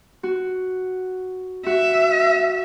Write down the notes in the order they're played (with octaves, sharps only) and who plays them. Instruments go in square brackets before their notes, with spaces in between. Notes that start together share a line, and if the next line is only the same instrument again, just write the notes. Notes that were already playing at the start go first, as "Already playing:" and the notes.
[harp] F#4
[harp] F#4 [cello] E5